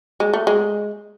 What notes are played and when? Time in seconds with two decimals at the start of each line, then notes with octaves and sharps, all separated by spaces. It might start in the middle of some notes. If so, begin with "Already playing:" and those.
0.20 G#3
0.33 A3
0.47 G#3